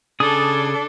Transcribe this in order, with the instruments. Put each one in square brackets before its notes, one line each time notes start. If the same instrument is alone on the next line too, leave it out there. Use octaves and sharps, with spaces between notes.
[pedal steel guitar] C#3 G#4 D#6 [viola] D4 A4